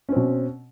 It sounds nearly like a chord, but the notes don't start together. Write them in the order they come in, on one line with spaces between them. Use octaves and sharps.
C#4 C4 B2